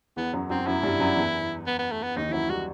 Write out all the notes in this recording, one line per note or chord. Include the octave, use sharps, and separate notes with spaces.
E2 E3 B3
F#2 F#3
F#2 F#3 C4
F#2 F#3 E4
G2 G3
F#2 F#3
E2 E3
B3
B3
A3
B3
D#2 D#3 D#4
E3
F#2 F#3 E4
G3 F#4